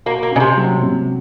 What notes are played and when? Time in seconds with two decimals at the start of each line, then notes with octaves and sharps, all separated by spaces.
0.06 A#3 F#4
0.23 A#3
0.31 C#3 C#4
0.40 C3
0.57 F#3
0.83 C3